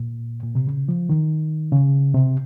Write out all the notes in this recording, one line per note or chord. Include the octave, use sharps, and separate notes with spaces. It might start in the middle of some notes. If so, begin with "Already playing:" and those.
Already playing: A#2
A#2
C3
C#3
F3
D#3
C#3
C3